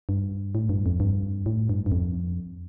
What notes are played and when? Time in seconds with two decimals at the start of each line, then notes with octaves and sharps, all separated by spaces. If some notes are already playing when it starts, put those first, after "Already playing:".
0.09 G2
0.55 A2
0.69 G2
0.86 F2
1.00 G2
1.46 A2
1.69 G2
1.86 G2
1.92 F2